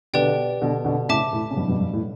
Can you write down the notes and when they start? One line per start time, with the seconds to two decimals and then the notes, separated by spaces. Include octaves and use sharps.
0.13 B2 D3 G4 B4 D5 G5
0.61 B2 D3
0.84 B2 D3
1.08 A2 C#3 E5 A5 D6
1.33 A2
1.50 C#3
1.56 G2 B2
1.68 G2 B2
1.80 G2
1.93 A2